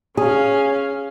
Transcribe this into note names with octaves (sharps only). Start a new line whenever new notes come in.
C#4 G#4 F5